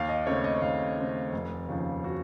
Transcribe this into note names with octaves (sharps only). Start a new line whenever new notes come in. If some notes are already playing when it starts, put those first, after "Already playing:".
Already playing: D#2 F5
D#5
C#3 A3 C4 C#5
D#5
D#2 F5
C#3 A3 C4
F1
D#2 C#3 F3
F#4